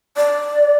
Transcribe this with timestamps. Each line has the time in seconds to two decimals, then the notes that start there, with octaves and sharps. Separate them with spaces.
0.17 D5